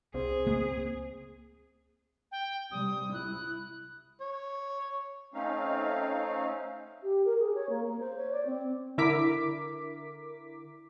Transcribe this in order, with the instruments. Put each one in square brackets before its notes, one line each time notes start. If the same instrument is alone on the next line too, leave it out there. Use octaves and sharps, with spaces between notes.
[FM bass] C2 [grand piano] C4 [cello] G#4
[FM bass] C#2 [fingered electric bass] A#3
[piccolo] G5
[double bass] C3 G3 [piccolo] D#6
[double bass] E4 [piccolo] F#6
[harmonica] C#5
[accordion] A3 C4 C#4 D#4 F5
[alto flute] G4
A#4
G#4
C#5
A#3
A#3
C5
C#5
D5
C4
[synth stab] D3 E4 A#4 D6 B6